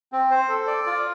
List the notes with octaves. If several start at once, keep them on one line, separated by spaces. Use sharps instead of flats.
C4
C5
A4
D5
F4